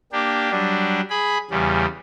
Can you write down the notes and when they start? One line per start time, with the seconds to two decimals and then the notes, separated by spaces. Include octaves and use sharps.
0.12 A#3 D4 G4
0.51 F#3 G3 D4
1.10 G#4 B5
1.51 E2 C#3 G3